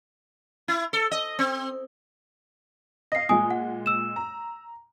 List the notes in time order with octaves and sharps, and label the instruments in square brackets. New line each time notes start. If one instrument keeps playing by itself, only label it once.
[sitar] E4
A4
D#5
C4
[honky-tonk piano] D#5 F5 [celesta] A#6 C7
[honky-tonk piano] A#2 G#3 [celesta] G#5 D#6
[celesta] F#5
E6 E7
[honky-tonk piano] A#5